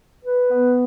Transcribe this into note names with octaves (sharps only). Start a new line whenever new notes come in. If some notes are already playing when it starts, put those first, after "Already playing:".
B4
B3